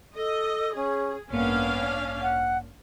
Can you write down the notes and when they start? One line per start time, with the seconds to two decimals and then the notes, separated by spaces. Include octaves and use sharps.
0.16 A4 D#5
0.75 C#4 G#4
1.31 A1 G2 A#3 B3 C#4 D4 F5
2.22 F#5